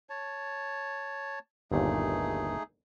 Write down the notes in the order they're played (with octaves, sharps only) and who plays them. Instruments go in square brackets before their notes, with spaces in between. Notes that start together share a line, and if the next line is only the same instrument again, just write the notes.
[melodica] C#5 A5
[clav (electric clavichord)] G1 D#2 A#2 [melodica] A3 D#4 G#4